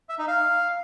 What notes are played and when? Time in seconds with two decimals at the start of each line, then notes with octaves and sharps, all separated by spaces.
0.09 E5
0.18 D#4
0.28 F5